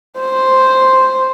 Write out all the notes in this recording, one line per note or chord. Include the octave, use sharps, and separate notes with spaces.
C5